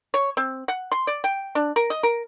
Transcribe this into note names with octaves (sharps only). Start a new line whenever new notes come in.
C#5
C4
F#5
C6
D5
G5
D4
A#4
D#5
A#4